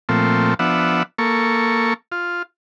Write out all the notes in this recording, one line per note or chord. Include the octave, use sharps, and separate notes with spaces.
A#2 F3 A3 C4
F3 B3 D4 E5 F#5
A#3 A4 C#6
F4